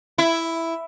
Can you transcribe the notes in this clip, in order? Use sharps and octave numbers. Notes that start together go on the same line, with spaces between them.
E4